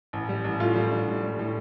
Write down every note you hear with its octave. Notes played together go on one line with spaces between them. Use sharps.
A1
G3
A1
A2 F4
G3
D4
A2
G3
A2